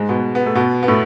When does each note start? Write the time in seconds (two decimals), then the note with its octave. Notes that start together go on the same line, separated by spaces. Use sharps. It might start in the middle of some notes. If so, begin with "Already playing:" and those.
Already playing: G#2 G#3
0.09 B2 B3
0.35 B3
0.46 A3
0.55 B2 B3
0.83 B3
0.88 A2 A3